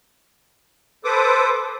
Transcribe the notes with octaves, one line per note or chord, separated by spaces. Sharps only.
A4 B4 C5 D6 D#6